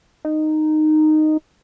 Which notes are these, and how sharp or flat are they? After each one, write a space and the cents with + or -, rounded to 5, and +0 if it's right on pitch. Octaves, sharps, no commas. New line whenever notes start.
D#4 -10